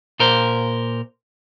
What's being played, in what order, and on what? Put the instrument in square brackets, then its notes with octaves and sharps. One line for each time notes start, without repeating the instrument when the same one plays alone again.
[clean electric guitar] A#2 A#4 C5